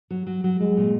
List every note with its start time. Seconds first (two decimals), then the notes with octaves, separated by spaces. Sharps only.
0.10 F#3
0.27 F#3
0.44 F#3
0.60 F#3 G#3
0.77 A#2